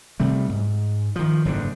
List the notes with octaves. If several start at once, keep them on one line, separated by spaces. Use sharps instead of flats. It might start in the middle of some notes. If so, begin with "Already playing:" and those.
C3 G3 A3
G#2
D#3 F3
F#1 G#2 D3